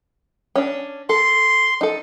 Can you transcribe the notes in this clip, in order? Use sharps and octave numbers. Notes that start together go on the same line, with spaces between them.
C#4 D4
A4 C6
D#4 A4